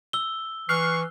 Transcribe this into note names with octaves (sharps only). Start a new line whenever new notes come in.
E6 G7
E3 C#6 F6 F#6 C7